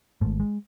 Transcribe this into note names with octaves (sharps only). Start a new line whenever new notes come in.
G#1 G#2 A3
G#3